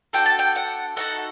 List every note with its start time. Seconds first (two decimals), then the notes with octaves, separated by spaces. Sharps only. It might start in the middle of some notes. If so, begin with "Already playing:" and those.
0.13 D4 F#4 A4 G5
0.26 A5
0.39 G5
0.56 F#5
0.96 A3 D#4 F#4 A4 F#5